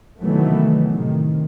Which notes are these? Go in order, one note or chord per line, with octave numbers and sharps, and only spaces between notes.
C3 D#3 E3 F#3 A3 B3
A2 C3 D#3